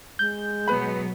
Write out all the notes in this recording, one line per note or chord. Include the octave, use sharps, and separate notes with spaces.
G#3 G6
B2 F#3 B3 B4 B5